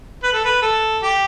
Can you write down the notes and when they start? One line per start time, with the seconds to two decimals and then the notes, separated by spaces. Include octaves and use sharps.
0.23 B4
0.33 A4
0.45 B4
0.62 A4
1.03 G4